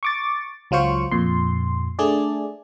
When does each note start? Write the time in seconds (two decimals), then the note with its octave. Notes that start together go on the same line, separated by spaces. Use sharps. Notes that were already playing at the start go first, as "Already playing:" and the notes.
0.03 C#6 D6 A6
0.71 C#2 F#3 F4 C5 C#6
1.12 F2 A#2 C6
1.99 A3 D4 G#4 D5